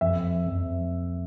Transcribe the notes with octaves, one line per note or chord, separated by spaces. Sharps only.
F2 E5
F2